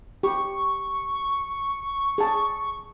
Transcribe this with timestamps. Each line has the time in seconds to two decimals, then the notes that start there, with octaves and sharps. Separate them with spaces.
0.23 G4 C#6
2.18 G#4 A5